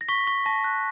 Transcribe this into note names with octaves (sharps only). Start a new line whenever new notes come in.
A#6
C#6 B6
C#6
A5 A#6
F#6